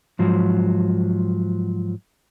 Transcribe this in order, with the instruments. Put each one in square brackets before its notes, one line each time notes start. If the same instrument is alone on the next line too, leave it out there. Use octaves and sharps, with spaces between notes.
[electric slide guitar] G#2 F3 F#3